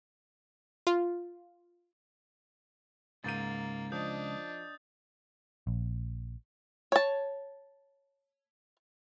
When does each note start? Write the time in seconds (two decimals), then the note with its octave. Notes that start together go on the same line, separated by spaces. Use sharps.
0.87 F4
3.24 C#2 G#2 A#3 G6 A6 D#7
3.92 F3 D4 D#5 D#6 G6
5.67 A#1
6.92 C#5 A5